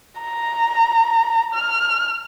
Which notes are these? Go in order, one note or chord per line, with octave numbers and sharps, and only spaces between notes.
A#5
F6